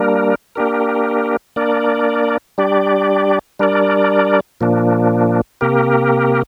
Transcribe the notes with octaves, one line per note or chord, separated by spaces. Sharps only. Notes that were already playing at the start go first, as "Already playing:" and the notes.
Already playing: G3 A#3 D4 A#4
A#3 D4 G4 A#4
A#3 D4 A#4 D5
G3 D4 G4 D5
G3 D4 A#4 D5
A#2 F3 A#3 D4
C3 A#3 G4 A#4